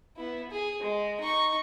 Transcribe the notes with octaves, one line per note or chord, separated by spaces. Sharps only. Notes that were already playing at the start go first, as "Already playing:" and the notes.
B3 E4
G#4
G#3
D#4 C#6